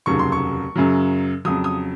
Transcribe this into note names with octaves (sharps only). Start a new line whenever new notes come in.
F1 D#2 C#3 F#3 C#6
C6
C#6
F#2 C#3 F#3
F2 C#3 F#3 D#6
D#6